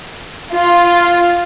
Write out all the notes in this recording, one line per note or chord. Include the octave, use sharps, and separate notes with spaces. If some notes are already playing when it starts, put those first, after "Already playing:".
F4